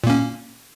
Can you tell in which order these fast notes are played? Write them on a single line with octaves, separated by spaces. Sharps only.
A#2 A#3 C#4